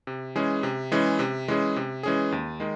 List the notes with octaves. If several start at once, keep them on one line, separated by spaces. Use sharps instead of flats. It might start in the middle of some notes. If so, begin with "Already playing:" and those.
C3
E3 G#3 C#4 G#4
C3
E3 G#3 C#4 G#4
C3
E3 G#3 C#4 G#4
C3
E3 G#3 C#4 G#4
D#2
D#3 G#3